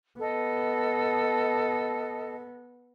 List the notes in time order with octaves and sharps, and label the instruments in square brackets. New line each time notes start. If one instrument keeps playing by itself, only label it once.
[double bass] B3 [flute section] A4 D#5